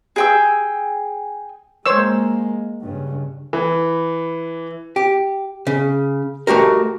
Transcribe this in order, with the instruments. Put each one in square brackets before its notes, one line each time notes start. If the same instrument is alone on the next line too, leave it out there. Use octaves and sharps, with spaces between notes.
[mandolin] G#4 G5 E6
[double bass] G#3 A#3 [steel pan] C5 C#5 E6
[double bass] G2 C#3
[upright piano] E3
[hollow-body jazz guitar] G4
C#3
A3 F#4 G4 A#4